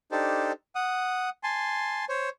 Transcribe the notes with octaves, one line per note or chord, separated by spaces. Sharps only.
D4 D#4 G4 A4 C5
F#5 D#6
G#5 A5 C6
C5 C#5